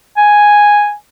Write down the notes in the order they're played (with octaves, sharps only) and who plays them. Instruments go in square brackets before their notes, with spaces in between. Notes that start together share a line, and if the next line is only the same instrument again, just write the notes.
[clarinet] G#5